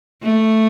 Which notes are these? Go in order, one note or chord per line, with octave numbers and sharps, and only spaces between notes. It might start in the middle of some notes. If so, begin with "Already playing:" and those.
A3